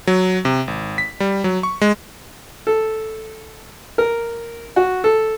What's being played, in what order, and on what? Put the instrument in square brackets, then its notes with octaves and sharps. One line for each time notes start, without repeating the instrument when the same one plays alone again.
[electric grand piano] F#3
C3
G#1
B6
G3
F#3
C#6
G#3
[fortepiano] A4
A#4
F#4
A4